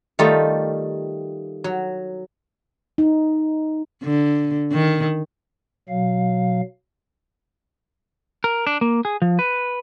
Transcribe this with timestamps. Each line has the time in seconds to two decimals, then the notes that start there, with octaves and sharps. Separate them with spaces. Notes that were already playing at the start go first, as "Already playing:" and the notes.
0.19 D#3 G3 A3 D#4 F4 G4
1.64 F#3
2.98 D#4
4.03 D3
4.72 D#3
5.89 B2 F#3 F5
8.44 A#4
8.67 D4
8.81 A#3
9.05 G#4
9.22 F3
9.39 B4